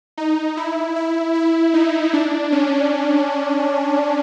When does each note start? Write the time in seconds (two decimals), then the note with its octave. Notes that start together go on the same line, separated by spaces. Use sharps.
0.17 D#4
0.57 E4
0.96 E4
1.35 E4
1.74 D#4
2.13 D4
2.52 C#4